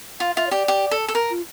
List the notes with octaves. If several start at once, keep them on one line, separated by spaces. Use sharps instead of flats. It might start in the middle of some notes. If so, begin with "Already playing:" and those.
F4 F5
F4 E5
C#5
G4 D5
G4
A4
A4
A#4
F4